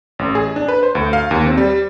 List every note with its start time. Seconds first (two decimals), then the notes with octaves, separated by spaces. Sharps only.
0.19 A1
0.35 G#4
0.56 D4
0.68 B4
0.83 C5
0.95 D2
1.13 F5
1.31 D#2
1.46 C4
1.57 G3